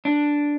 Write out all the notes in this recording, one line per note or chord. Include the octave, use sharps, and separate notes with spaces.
D4